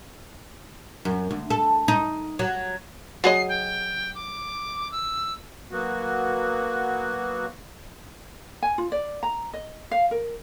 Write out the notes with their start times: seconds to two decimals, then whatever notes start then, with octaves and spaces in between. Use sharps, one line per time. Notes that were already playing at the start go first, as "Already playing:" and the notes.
1.05 F#2
1.31 D2
1.50 A4
1.88 D#4
2.39 F#3
3.24 F#3 G#4 D#5 C7
3.49 G5
4.15 D6
4.92 E6
5.71 F#3 A#3 B3 F#4
8.63 G#5
8.78 F4
8.92 D5
9.23 A#5
9.53 D#5
9.91 F5
10.11 A#4